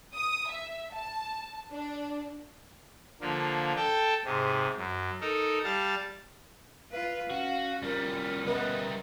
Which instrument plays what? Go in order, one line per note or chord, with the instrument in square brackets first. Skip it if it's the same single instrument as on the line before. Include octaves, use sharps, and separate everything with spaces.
[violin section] D#6
E5
A5
D4
[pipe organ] D3 F3 A#3
A4 G5 A5
G#2 C3
F#2
D#4 A4 A#4
G3 F5 A5
[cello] F4 B4 [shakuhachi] F5
[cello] C#4 [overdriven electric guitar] F#4
[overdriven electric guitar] F3 G3 [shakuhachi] A#4
[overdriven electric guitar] G3 A#4 [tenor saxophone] B3 [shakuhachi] D#5